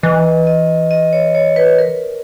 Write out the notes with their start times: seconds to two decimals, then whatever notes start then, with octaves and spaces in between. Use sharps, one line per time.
0.03 E3 D#5
0.47 D#5
0.91 D#5
1.13 C#5
1.35 C#5
1.56 B4
1.79 A#4